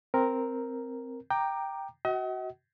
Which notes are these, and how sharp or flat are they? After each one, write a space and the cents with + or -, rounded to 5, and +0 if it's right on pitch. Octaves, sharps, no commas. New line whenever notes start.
C4 +0 A#4 +0
G5 +0 A#5 +0 D6 +20
F#4 +10 D#5 +40 F#5 +40